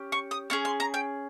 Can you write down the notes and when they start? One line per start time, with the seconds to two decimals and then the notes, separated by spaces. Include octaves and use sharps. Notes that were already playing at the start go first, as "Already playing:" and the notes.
Already playing: C#4 G4
0.12 C#6
0.31 D#6
0.50 C#4 G#4 C#6
0.65 C6
0.80 A#5
0.94 G5